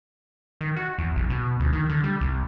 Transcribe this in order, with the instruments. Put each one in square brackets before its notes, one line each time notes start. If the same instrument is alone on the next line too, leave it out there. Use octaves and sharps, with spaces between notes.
[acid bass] D#3
F#4
E2
B1
B2
D2
D#3
D3
G3
C2